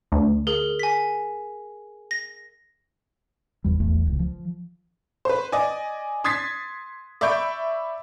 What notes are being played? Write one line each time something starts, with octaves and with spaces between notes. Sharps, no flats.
D2
G#4 A#4
G#5 B6
A#6
F1 E2 G3
D1 B1 E2 A3
D1 C#2
F3
B4 C5
D5 D#5 G#5
C6 D#6 G#6 A6 B6 C7
D5 E5 B5 C#6 G6 D7